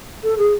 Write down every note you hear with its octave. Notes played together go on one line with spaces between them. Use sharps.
A4
G#4